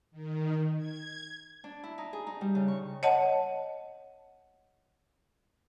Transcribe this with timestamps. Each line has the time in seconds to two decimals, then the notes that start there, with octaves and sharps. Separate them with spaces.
0.11 D#3
0.77 G#6
1.64 D4
1.83 E4
1.98 D#4
2.13 G#4
2.27 D#4
2.41 G3
2.55 C#3
2.68 C#6
3.03 C#5 D#5 F#5 A5